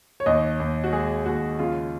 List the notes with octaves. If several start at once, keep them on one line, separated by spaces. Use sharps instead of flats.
C#5
D#2 D#5
D#2
F#4
G#3 G#4
D#2 F#4
C#3 F4